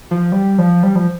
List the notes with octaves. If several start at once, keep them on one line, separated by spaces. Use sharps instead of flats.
F3
G3
F3
G3
F3